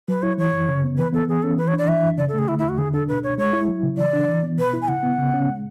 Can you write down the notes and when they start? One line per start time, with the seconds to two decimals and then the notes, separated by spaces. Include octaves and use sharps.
0.08 F#3 B4
0.23 E4 C#5
0.38 E3 C#5
0.53 F#2
0.69 C#3
0.84 B3
0.98 E3 B4
1.13 B3 A4
1.28 E3 G#4
1.43 C#4 A4
1.58 E3 B4
1.68 C#5
1.73 D4 D5
1.88 E3 E5
2.03 F#2
2.18 C#3 D5
2.29 A4
2.34 A3 G#4
2.48 D3 E4
2.59 E4
2.63 E2
2.69 F#4
2.78 D3 G#4
2.93 D4 A4
3.08 B2 B4
3.23 C#2 C#5
3.38 G#3 C#5
3.53 E4
3.68 F#3
3.83 C#3
3.98 E3 D5
4.13 D4
4.28 E3
4.43 B3
4.58 B2 B4
4.73 E4
4.82 G#5
4.88 C#3 F#5
5.03 B3
5.19 C#3
5.34 C#4
5.49 G#3